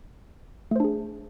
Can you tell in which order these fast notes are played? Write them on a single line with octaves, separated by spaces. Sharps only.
A3 C5 D4 G#4